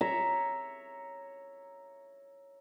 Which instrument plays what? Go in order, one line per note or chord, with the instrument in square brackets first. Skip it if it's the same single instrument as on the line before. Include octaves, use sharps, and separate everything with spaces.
[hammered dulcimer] C#5 E5 A#5